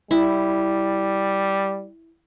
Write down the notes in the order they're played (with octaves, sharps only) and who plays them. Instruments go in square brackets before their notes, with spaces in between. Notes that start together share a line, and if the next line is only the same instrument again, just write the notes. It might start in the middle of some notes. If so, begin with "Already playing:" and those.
[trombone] G3 [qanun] E4